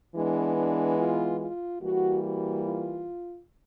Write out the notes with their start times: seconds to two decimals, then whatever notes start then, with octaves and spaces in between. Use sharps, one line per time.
0.15 E3 G#3 B3 D4
0.57 D4
0.99 F4
1.40 F4
1.82 E3 G3 A#3 F#4
2.25 F#4
2.65 F4